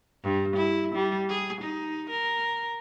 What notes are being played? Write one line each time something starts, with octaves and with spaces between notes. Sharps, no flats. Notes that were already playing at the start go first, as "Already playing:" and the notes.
G2
E4
G3
G#4
D#4
A#4